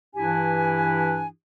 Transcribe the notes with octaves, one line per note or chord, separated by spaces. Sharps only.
G2 E3 D4 E4 G4 G#5